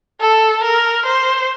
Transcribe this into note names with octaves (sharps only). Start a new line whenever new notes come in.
A4
A#4
C5